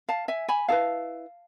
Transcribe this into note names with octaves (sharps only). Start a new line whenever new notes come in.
F5 A5
E5 G#5
G#5 B5
E4 G#4 B4 F5 A5